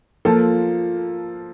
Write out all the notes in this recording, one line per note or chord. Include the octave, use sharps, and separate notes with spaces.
F3 A#3 F4 A4